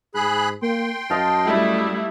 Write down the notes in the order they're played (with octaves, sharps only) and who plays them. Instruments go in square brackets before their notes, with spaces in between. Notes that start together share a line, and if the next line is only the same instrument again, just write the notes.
[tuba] G#2 [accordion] G#4 B5 F#6
[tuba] A#3 [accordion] G5 C6
[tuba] F#2 [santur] D#5 F5 A5
[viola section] G3 A3 E4